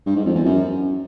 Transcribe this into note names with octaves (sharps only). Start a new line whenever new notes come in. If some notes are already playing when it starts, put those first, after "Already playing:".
G2
G#2
F2
E2
F#2